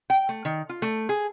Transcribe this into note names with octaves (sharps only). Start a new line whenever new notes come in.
G5
A3
D#3
F4
A3
G#4